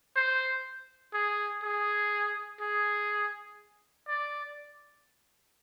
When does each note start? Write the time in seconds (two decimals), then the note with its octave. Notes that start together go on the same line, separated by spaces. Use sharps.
0.16 C5
1.14 G#4
1.63 G#4
2.61 G#4
4.08 D5